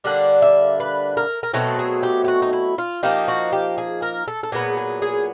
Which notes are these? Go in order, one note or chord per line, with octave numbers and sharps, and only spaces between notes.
D3 G3 A#3 D4 F#5
E5
B4
A#4
A#4
B2 F#3 A3 C4 A4
G#4
G4
G4
F#4
D#4
E4
F4
F3 A#3 D#4 G4
F#4
G4
G#4
A#4
A4
A4
A#2 F#3 B3 G#4
G#4
G#4